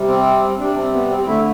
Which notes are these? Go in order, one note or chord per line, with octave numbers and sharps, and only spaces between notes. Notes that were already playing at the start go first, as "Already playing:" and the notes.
Already playing: C3 G3
C4
C3 G3 D4
C4
B3
C4
D3 A3 E4